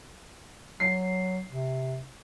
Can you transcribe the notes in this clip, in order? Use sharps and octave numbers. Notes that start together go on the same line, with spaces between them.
F#3 C7
C3